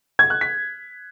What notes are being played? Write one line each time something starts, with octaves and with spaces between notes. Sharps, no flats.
G#6
F#6
B6